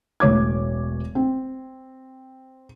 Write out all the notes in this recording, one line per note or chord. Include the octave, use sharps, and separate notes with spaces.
E1 A1 C#5 D6 G#6
C4